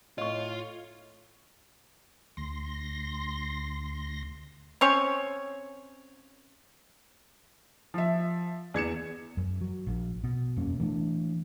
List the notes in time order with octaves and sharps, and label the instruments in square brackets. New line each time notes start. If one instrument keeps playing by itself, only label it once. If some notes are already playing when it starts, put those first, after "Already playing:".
[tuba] A2 [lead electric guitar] F4 [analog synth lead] C#5 [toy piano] D#5 C#6
[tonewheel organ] D2 C6 A#6
[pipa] C4 C#4 C#5
[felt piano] F3 E5
E2 G#6 C#7 E7
[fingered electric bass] F#2
F#3
A#1
B2
E1 F#2 A#3 C#4
E3 A3 D4